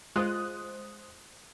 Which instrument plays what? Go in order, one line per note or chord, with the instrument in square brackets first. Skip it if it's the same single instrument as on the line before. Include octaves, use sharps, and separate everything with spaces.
[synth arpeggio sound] G#3 F4 [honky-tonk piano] C5 D#6 F#6